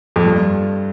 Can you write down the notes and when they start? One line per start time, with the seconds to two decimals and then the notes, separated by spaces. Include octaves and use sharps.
0.16 F2
0.24 G2